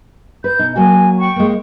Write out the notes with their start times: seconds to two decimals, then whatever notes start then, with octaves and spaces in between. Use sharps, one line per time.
0.44 B4 G6
0.59 B2 D#4
0.76 F#3 A#3 F#4 G#5
1.18 G5 C#6
1.36 G#3 A#3